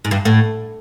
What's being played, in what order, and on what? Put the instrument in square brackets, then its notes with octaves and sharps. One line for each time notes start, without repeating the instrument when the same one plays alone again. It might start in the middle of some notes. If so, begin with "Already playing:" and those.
[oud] G#2
G2
A2